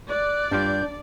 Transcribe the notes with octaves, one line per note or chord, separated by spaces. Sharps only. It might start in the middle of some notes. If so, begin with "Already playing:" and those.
D5 F#6
G2 G3 D4 F4 G6